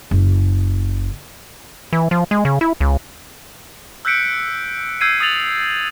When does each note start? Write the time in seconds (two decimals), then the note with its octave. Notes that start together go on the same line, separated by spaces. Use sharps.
0.11 F#1
1.93 E3
2.11 F3
2.31 G#3
2.45 C#3
2.61 E4
2.81 C#2
4.05 E6 F#6 G6 B6 C#7 D7
5.01 E6 G6 G#6 C7 D#7
5.20 D#6 E6 A6 F7 F#7